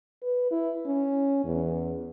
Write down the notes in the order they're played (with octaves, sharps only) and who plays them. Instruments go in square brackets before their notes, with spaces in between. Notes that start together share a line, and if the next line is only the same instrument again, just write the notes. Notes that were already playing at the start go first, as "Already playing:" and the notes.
[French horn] B4
E4
C#4
E2